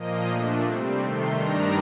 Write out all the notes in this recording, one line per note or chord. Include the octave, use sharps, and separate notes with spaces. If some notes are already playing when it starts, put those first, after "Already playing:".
Already playing: A#2 F3 A#3 D#5
A#2 A3 D4
C3 G3 C4
C3 D#3 A3 C6
G2 D#3 G3 D4 A#5